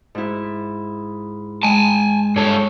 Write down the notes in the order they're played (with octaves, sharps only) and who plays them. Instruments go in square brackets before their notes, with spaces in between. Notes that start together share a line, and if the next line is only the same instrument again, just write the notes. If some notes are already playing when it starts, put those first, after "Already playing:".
[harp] G#2 E4
[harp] G#3 [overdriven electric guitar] G#5 A5
[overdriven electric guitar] G2 A4 [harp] C#5